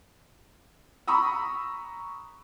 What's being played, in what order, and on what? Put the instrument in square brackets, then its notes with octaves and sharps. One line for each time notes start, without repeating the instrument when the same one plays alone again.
[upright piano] A#5 B5 C#6 D#6 E6